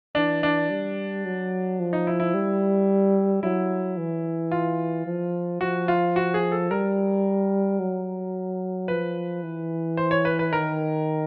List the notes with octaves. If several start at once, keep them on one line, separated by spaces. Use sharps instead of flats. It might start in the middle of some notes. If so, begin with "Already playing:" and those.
E3 D4
D4
G3
F#3
F3
D#4
E4
E4
G3
F#3 E4
E3
F4
F3
F3 F#4
F4
F#4
G#4
A4
G3 A#4
F#3
F3 B4
E3
C5
C#5
B4
B4
D#3 A#4